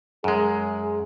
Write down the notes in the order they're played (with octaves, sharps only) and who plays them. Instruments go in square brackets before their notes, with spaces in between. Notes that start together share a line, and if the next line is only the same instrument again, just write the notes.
[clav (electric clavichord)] F#2 G#3 [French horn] G#4